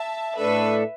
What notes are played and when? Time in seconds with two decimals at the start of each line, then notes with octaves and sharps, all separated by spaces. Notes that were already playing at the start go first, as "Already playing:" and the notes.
Already playing: E5 A5
0.36 A2 A3 D4 A4 B4 E5